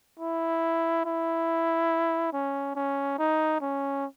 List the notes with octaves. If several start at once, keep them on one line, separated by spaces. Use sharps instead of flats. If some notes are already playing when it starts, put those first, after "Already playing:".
E4
E4
C#4
C#4
D#4
C#4